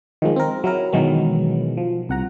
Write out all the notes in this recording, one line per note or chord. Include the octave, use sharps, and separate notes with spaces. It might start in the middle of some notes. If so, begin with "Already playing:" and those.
D#3 F3 G#3
C4 A#4
F#3 E4 A#4
B2 D#3 E3 F#3 G#3 B3
F3
C2 F#5 A#5